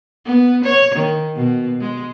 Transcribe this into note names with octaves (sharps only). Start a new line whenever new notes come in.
B3
C#5
D#3
B2
G#3